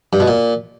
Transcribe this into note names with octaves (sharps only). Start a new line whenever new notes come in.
G2
B2
A#2